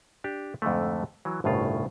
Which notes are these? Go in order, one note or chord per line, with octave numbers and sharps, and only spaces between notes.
D4 G4
F2 G#2 D3 A3
E3 F#3
G1 C2 A2 C#3 F4